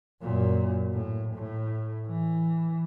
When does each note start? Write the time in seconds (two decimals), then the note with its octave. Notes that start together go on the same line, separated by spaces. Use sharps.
0.22 F#2 A#2
0.93 A2
1.35 A2
2.07 E3